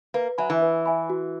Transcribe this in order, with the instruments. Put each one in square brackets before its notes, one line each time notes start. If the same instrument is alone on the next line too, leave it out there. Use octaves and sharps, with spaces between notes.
[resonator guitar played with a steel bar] A#3 [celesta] B4
[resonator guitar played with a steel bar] F#3 [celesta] E5 G#5 B5
[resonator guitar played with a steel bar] E3
[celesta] B4
E5 G#5 B5
F#4